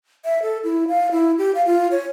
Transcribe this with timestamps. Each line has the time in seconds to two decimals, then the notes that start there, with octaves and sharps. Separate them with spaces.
0.25 E5
0.42 A4
0.64 E4
0.88 F5
1.12 E4
1.38 G4
1.55 F5
1.66 F4
1.91 C#5